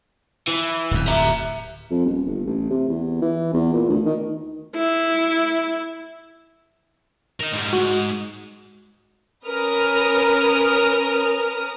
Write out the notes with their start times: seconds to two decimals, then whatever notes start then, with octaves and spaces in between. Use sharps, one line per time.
0.48 E3
0.91 D1 F2
1.08 E5 A#5
1.91 F2
2.05 D#1
2.26 G1
2.46 A1
2.70 C3
2.89 E2
3.22 E3
3.53 E2
3.74 A#2
3.89 D2
4.05 D#3
4.76 E4
7.40 A#4 D#5
7.52 G#2 G3
7.73 G#2 G#3 F#4
9.46 C#4 A#4 B4 D#6 F6